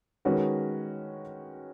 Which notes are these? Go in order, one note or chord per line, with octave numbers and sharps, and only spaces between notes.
D#3 G#3 C#4 F#4 B4